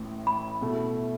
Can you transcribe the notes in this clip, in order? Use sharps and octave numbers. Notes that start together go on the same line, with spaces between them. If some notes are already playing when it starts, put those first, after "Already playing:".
Already playing: A1 A2 E3
B5
B2 A3 E4 A4